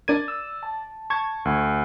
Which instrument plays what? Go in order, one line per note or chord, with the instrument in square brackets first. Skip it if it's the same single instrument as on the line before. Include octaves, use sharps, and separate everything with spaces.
[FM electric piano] D4 A#4 G#6 [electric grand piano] D5 D#7
[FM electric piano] E6
A5
[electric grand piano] A5 [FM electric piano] C#6 G#6
[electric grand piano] D2